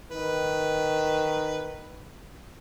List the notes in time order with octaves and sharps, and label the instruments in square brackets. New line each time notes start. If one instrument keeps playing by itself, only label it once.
[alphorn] D#3 [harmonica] B4